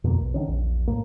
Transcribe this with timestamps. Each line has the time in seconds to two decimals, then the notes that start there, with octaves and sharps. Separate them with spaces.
0.04 F2 B2 D3 A#3
0.20 B1
0.34 D3 D#3 C#4
0.48 A#1 E2
0.87 A2 A#3